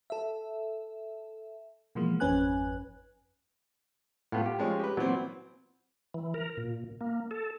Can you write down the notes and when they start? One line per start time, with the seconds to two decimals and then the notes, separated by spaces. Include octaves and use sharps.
0.10 A4 E5
1.95 B2 E3 F3 G#3 A#3
2.20 G#1 F2 C#4 B4 G#5 F#6
4.32 A2 B3 F4
4.46 G4
4.59 F3 G#3 C#4
4.79 G4 B4
4.97 A#2 E3 F#3 B3 C4
6.14 E3
6.34 A#4
6.57 A#2
7.01 A#3
7.31 A4